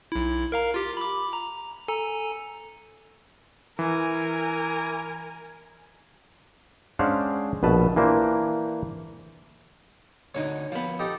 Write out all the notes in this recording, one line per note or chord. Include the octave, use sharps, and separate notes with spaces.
B1 E4
A#4 F5 A#5
F4 G4
B5 D6
A#5
A4 G#5 A#5
E3 A#4 G#5
G#3 C#4 D4 C5 F5 F#5
A#1 B2 B4 A5
E3 A#3 D4 C5
D2 D3 D#4 C#5
F3 B3
D#4 G4 A4